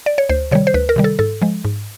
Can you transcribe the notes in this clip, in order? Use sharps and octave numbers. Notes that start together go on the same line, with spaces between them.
D5
C#5
D2 C5
C3 D#3 G3 C#5
C5
D2 B4
A#4
C3 D#3 G3
A4
G#2 A4
F3 G#3
G#2